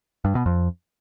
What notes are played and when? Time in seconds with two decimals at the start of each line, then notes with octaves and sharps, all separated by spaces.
0.25 G2
0.35 B2
0.46 F2